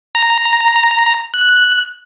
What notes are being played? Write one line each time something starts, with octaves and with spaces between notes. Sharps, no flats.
A#5
F#6